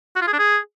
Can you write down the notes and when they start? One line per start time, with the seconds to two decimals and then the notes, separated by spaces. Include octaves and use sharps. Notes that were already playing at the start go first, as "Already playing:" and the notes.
0.16 F#4
0.21 F4
0.27 G#4
0.33 D4
0.39 G#4